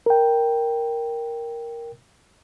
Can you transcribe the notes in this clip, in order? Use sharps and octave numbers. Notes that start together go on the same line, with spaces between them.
A#4 G5